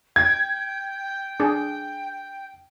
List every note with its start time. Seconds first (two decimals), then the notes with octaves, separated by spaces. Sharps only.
0.16 G5 G#6
1.40 D4 G#4